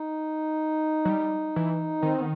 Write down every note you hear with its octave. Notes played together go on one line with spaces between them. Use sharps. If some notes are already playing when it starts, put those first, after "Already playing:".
Already playing: D#4
F#3
G3
E3
D#3 C4
B3